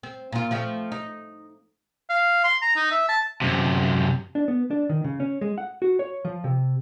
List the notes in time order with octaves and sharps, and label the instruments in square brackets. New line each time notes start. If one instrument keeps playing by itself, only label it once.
[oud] C4
A#2 F4
F3 A3 C4
D#4
[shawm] F5
C6
A#5
D#4
E5
A5
[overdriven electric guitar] F#2 C3
[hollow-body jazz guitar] D4
B3
D4
D#3
C#3
C#4
G#3
F#5
F#4
C#5
F3
C3